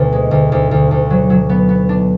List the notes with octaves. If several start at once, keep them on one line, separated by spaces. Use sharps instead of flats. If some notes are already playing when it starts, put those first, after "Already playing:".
Already playing: D2 B2
G#3
D2
D2
D2
D2
F#3
F#3
B3
B3
D4